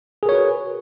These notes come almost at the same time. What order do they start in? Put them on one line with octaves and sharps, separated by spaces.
G#4 A#4 C#5 F#4 B4